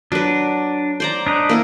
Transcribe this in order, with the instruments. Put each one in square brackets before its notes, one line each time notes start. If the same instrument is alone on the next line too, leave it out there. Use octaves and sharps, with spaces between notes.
[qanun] F#3 B4 [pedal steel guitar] D4
[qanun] C5 D5 A#5
[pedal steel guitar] D4 D#4 B4
[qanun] A#3 E4 A#4